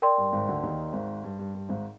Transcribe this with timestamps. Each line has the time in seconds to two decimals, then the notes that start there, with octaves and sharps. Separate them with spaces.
0.02 A#4 D5 G5 C6
0.18 G2
0.33 G#1 G#2
0.48 D2 D3
0.63 D#2 D#3
0.93 G#1 G#2
1.24 G2
1.39 G2
1.55 G2
1.69 G#1 G#2